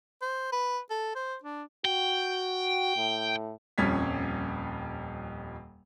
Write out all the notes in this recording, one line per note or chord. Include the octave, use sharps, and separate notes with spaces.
C5
B4
A4
C5
D4
F#4 G5
A2
D#1 F2 G3 C#4 G#6 B6